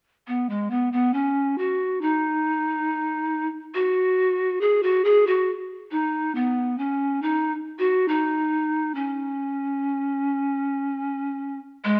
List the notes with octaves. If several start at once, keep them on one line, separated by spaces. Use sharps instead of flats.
B3
G#3
B3
B3
C#4
F#4
D#4
F#4
G#4
F#4
G#4
F#4
D#4
B3
C#4
D#4
F#4
D#4
C#4
G#3